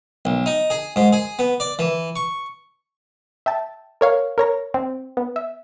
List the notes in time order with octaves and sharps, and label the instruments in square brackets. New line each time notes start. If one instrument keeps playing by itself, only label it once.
[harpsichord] B1
D#4
G#4
G#2
G#4
B3
D5
E3
C#6
[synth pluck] E5 G5 A5
A#4 C#5 F5
A#4 C#5 A#5
C4
B3
E5